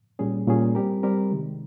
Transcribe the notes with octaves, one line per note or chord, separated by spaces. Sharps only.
A#2 G3 C#4 G#4
A#2 G3 C#4 G#4
G3 C4 G4 A#4
G3 C4 G4 A#4
C3 D#3 G#3